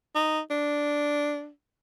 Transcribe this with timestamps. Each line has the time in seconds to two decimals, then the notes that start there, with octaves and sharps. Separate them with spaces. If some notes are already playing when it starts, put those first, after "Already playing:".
0.15 D#4
0.50 D4